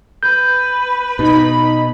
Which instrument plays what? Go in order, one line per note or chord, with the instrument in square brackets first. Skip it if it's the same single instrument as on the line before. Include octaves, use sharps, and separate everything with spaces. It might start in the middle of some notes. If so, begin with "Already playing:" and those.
[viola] B4 [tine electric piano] G6
[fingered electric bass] B2 [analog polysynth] D#4 B5